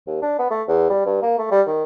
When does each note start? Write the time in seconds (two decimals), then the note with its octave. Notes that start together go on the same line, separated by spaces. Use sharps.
0.07 D#2
0.22 D4
0.39 B3
0.51 A3
0.68 E2
0.90 G3
1.06 G2
1.23 A#3
1.38 A3
1.51 G3
1.67 D#3